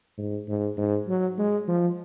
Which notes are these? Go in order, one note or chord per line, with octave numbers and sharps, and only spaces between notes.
G#2
G#2
G#2
F#3
G#3
F3